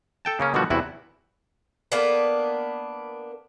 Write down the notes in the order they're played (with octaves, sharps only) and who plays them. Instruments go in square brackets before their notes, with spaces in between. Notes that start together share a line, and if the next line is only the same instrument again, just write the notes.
[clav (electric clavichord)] A4 G5 A5
C#3 A#3 C#4
B2 D3 D#3 F3 G3 F#4
E2 C3 E4 F#4
[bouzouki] A#3 B3 D4 B4